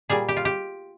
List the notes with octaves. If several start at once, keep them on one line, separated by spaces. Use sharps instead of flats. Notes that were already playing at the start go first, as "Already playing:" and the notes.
A#2 G3 G#4
G4
F4
G4